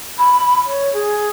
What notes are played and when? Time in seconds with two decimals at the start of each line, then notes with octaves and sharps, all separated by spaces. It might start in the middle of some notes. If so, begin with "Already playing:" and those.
0.19 B5
0.66 C#5
0.93 G#4